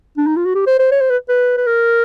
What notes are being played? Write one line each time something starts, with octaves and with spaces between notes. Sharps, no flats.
D4
D#4
F4
F#4
G4
C5
C5
C#5
C5
B4
B4
B4
A#4